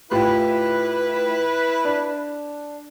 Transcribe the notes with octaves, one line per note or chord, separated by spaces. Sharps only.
A2 E4 F4 G4 B4
D4